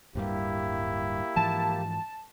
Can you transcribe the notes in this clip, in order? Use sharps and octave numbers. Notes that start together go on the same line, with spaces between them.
D1 G2 G3 A#3 E4 G4
G#2 E3 F3 A5